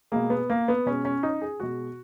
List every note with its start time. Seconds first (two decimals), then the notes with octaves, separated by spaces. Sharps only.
0.12 B2 G#3 A#3
0.30 B3
0.50 A#3
0.68 B3
0.86 B2 G#3 C#4
1.05 C#4
1.23 D#4
1.42 G#4
1.60 B2 G#3 F#4